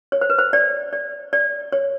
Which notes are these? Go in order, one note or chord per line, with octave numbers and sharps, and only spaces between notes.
C#5
C5
B4
C5
D5
D5
D5
C#5